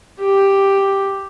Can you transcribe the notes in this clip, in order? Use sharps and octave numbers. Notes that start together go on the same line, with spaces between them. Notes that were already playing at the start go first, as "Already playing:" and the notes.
G4